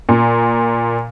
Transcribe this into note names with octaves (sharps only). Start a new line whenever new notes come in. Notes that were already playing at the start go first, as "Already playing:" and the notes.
A#2